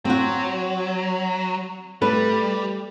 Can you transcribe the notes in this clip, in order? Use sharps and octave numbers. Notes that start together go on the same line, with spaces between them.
F#3 C4 F#4
G3 A3 B4